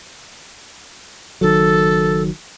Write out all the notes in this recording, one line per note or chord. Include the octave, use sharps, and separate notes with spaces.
F#1 D#3 F#3 A4